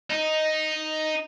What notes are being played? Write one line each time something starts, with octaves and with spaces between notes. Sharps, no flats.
D#4